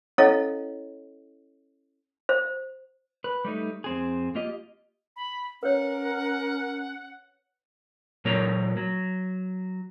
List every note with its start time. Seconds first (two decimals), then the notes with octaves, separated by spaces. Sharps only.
0.18 C#4 E4 A4 C#5 D#5 F5
2.29 C5
3.24 B4
3.45 G3 A3 D#4
3.84 F2 C4 G#4
4.35 A#3 F4 G4 D#5
5.16 B5
5.63 C#4 A#4 B4 C#5 F#5
8.25 A#2 F#3 A#3 A#4 C#5 A#5
8.77 F#3